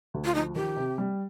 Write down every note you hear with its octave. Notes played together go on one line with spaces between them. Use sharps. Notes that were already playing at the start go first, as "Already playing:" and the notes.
D2
F4
F3 D#4
D#3 G4
C3
G3